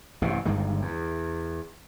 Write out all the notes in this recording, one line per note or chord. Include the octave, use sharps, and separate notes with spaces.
A1 G2 C3
G1 G2 D#3 G#3
E2